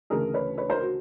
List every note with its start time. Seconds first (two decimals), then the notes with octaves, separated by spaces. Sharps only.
0.10 D2 C#3 E3 A3 G#4 A#4
0.34 B4 C#5
0.58 B4 C#5
0.70 A#4 C5
0.81 F#4